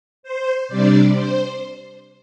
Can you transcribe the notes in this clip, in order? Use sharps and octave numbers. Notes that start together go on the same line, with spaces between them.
C5
C3 G3 D4 D5
C5